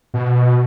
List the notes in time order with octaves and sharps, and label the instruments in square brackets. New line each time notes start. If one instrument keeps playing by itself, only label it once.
[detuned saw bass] B2